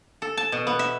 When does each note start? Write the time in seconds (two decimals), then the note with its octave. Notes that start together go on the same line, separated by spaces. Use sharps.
0.22 A4
0.37 A5
0.52 B2
0.67 B3
0.79 E5